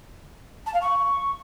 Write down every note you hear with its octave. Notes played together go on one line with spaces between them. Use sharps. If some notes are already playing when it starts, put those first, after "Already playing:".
A5
F5
C#6